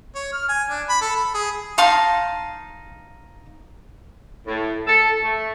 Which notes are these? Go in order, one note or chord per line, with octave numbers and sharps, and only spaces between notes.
C#5
F6
G#5
D4
B5
A4
B5
G#4
D#4 F5 A5 C6
A2
A4
A3